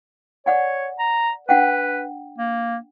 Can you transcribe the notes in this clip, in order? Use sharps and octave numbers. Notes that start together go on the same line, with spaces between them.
C#5 D5 F#5 G#5
A#5
D4 B4 F#5 G5
A#3